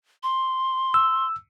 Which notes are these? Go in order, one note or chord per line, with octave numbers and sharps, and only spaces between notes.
C6
E6